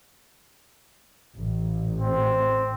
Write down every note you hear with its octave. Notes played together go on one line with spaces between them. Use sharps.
A1
C4